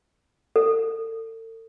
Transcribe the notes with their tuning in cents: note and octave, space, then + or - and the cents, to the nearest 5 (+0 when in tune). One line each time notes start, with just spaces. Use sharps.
A4 +40